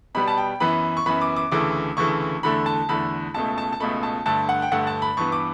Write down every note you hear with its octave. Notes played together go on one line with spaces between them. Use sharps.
B2 G3 B3 B5
A5
G5
F#2 E3 B3 B5
C#6
F#2 E3 B3 B5
D6
D6
D2 C#3 E3 A3 D6
D2 C#3 E3 A3 C#6
E2 D3 A3 B5
A5
E2 D3 A3 B5
C#2 B2 A3 A5
A5
A5
C#2 B2 A3 B5
A5
G2 D3 A3 A5
F#5
G5
G2 D3 A3 F#5
A5
B5
G2 E3 B3 C#6
D6